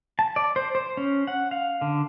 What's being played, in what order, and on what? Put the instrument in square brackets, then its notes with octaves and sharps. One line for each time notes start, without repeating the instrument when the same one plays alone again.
[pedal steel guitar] A5
D5
C5
C5
C#4
F#5
F5
D3